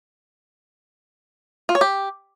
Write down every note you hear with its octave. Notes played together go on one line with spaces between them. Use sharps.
F4
C#5
G4